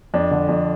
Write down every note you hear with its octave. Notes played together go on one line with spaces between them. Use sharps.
F2 D4
D3
F2